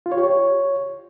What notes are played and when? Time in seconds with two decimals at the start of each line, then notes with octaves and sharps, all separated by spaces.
0.06 F4
0.12 C#5
0.17 G4
0.23 C#5